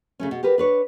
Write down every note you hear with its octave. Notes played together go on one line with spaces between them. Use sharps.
C#3 A3 C#4
B2
G4 A#4 B4
D4 B4 C#5